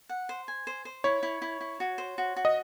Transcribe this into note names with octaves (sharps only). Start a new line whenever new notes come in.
F#5
C5
G#5
C5
C5
E4 C#5
E4
E4
E4
F#4
C5
F#4
F#4
D#5